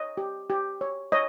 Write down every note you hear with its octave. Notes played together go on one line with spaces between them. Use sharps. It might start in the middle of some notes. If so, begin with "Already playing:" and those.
Already playing: C#5 D#5
G4
G4
C#5
C#5 D#5